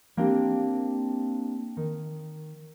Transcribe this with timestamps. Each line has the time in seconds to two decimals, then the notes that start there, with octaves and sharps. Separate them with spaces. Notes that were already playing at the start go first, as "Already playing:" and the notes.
0.17 A#3 C4 D4 G4
1.77 D#3